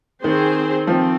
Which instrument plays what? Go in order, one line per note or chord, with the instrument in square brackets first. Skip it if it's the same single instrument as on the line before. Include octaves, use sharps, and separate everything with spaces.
[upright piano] D#3 [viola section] C4 G#4 C5
[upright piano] F3 [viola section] C4